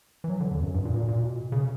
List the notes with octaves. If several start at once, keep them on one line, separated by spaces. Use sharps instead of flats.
E3
F#3
D3
E2
F#2
G2
A#2
A#2
A#2
B2
C#3